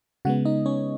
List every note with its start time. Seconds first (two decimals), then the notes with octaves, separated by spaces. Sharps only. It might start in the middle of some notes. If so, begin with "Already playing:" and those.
0.25 C#3 G#3 B3 F#4 F#5
0.45 D#4 D#5
0.66 C#4 C#5